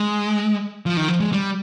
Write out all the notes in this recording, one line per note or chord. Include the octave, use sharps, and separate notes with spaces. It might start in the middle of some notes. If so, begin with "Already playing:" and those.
Already playing: G#3
F3
D#3
F3
G#3
G3